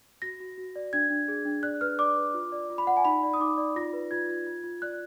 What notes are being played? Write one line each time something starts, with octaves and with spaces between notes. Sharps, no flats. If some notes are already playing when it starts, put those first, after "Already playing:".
F#4 A#6
F#4
F#4
D5
D4 G#6
D4
G#4
D4
D5 F#6
B4 F6
D5 D6
B4
F4
D5
F4
B5
D5 F#5
G#5
D#4 B5
D5
D#6
D#4 D6
D5
F4 A#6
B4
F4 G#6
F4
F4
F4
D5 F#6